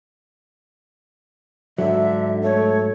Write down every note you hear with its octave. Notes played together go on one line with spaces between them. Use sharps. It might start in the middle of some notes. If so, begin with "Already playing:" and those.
G#2 D3 F#3 E5
A3 C#5